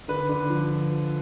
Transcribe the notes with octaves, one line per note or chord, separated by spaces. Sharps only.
D3 B4
D3
F3